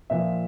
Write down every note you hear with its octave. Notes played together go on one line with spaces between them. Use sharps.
A#2 F3 E5